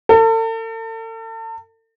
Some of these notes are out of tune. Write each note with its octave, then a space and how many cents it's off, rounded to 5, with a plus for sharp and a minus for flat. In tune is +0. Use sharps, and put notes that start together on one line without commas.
A4 +40